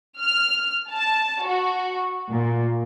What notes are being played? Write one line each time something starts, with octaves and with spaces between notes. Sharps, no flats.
F6
A5
F#4
A#2